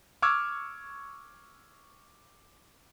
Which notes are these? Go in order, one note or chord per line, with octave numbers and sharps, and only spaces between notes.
C#6 D6 E6 F6 G#6